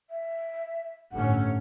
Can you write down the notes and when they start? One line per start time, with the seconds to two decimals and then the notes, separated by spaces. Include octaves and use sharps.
0.10 E5
1.12 G1 A2 C#4 F#5